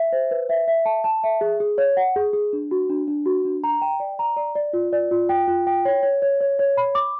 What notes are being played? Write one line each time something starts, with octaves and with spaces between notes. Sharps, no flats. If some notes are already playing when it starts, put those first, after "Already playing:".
Already playing: E5
C5
B4
E5
E5
A5
A5
E5
G#4
G#4
C#5
F#5
G#4
G#4
D4
F#4
D4
D4
F#4
D4
A#5
G5
D5
A#5
D5
D5
F4
D5
F4
G5
F4
G5
C#5
C#5
C#5
C#5
C#5
B5
D6